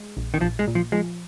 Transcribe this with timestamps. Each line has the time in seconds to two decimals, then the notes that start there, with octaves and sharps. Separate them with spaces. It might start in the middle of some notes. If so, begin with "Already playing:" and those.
Already playing: G#3
0.17 A#1
0.34 D#3
0.41 A#1 F3
0.59 G#3
0.67 A#2
0.75 F3
0.92 F3 G#3